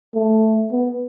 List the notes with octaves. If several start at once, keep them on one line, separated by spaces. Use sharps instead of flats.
A3
B3